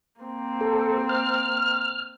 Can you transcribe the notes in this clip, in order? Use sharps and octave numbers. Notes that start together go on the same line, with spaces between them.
A#3 C4
A4
F6